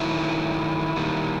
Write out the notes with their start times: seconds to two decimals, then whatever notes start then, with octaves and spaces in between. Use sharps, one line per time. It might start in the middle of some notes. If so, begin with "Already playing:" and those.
Already playing: D#3 F#3 A3 E4
0.96 D#3 G3 A#3